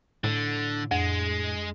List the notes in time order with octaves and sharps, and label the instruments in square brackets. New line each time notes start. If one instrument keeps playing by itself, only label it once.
[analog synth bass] A2 [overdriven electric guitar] D3
[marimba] F2 [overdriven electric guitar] G#3